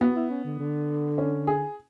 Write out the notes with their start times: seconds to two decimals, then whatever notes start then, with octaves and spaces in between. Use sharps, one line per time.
0.01 B3 F#4
0.16 E4
0.30 C#4
0.44 D3
0.59 D3
1.18 C#4
1.47 G#4